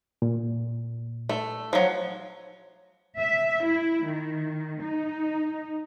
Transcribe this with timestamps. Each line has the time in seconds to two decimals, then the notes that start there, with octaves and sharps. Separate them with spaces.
0.22 A#2
1.29 A3
1.73 F3 F#3
3.20 E5
3.66 E4
4.06 D#3
4.84 D#4